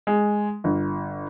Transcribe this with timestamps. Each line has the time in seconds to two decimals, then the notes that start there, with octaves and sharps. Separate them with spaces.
0.07 G#3
0.64 G1